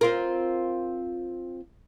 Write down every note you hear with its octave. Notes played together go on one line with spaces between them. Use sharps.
C4 F4 A#4